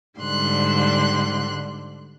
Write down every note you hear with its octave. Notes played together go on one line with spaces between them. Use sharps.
G#2 D3 G3 C6 F#6